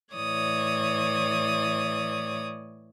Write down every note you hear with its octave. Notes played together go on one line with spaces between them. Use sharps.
A2 E3 C#5 D5 D#6